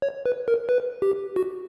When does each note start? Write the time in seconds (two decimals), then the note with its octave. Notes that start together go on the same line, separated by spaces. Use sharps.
0.02 C#5
0.26 B4
0.48 A#4
0.69 B4
1.02 G4
1.36 F#4